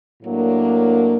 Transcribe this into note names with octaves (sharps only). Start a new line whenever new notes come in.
A2 F#3 A#3 D4